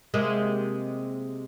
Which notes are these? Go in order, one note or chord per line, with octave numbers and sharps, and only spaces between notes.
C3 G#3 A#3